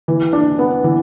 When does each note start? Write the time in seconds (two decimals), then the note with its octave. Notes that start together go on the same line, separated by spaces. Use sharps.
0.08 E3
0.33 D4
0.59 B3
0.84 E3